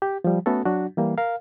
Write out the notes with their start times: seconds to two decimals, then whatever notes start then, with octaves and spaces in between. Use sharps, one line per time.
0.02 G4
0.24 F3 G3
0.46 A3 B3 C#4 F#4 A4
0.66 F#3 D4 F#4
0.97 E3 G3 A#3
1.18 A#4 F5